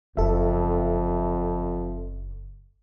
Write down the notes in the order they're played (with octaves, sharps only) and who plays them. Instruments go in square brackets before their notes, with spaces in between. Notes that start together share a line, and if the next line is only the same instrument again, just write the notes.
[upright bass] F#1 [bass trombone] F2 [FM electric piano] A4 E5